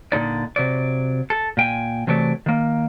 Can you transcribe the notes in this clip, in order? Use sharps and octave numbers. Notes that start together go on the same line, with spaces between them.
A#2 D3 D#4 D5
C3 F#3 D5
A4
A#2 G5 G#5
C3 E3 F#3 A3 D5
D#3 A#3